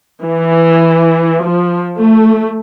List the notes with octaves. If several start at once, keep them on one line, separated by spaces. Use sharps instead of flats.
E3
F3
A3